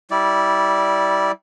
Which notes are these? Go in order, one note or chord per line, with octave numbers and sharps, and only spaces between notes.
G3 E4 D5